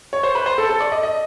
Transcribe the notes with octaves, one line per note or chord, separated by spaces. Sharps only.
C#5
C5
B4
C5
A4
A4
D5
D#5
D#5